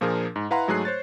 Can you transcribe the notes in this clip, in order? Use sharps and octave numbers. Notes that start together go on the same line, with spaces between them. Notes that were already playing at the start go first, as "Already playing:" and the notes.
A#2 F3 D4 G#4 A#4
G#2
E4 B4 F5 F#5 A#5 C6
G#2 F#3 A3 G#4 F#6 C7
C5 C#5 A6